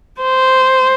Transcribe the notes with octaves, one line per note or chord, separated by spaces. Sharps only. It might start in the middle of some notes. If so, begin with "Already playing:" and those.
C5